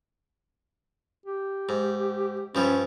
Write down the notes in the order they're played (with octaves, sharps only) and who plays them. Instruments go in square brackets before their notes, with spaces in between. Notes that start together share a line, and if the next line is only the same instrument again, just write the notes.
[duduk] G4
[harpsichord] G#2
[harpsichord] G2 F3 G3 [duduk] C#4